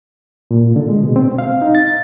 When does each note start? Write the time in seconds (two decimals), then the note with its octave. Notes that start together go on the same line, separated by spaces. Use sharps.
0.51 A#2
0.76 D3
0.89 G#3
1.03 B2
1.16 C4
1.38 F5
1.62 D#4
1.75 A6